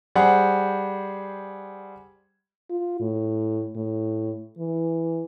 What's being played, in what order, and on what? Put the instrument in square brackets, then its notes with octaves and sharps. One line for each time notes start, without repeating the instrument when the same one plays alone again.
[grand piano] G3 G#4 C5 F#5
[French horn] F4
A2
A2
E3